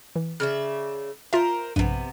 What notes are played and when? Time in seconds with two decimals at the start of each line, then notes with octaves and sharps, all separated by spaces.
0.16 E3
0.40 C#3 D5 E5 F6
1.33 F4 A#4 C5 E5
1.76 A#1 G2 C3 B3